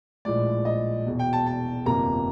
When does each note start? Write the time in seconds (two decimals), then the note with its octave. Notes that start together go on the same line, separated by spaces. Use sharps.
0.25 A#1 A2 F3 G#3 D5
0.65 D#5
1.06 E1 E2 B2
1.19 G5
1.33 A5
1.47 A5
1.86 G1 F2 C3 F3 A#3 A#5